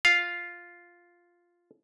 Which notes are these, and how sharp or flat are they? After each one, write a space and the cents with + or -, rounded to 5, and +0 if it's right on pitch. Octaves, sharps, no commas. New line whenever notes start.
F4 +0 F5 +0